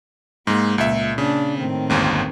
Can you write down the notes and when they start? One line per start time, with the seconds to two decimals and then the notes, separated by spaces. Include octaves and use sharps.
0.47 G#2 G#3 A#3
0.78 C#2 A#2 G#3 E5
1.18 C#3 D4
1.58 A2 D#3 C4
1.90 G1 D#2 G#2